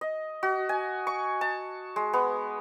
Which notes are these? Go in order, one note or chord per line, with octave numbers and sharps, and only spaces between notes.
D#5
F#4
G#5
C#6
A5
G#3
B3